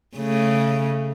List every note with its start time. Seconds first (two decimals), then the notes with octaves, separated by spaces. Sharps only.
0.17 C#3 A3